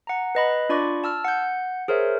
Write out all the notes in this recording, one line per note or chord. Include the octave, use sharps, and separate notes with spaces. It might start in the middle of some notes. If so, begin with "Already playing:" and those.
F#5 A#5
B4 D#5 B5 A#6
D4 F4 D5 B5 C#6 D6
A5 E6 F6
F#5 G6
G#4 A#4 C5 C#5 E5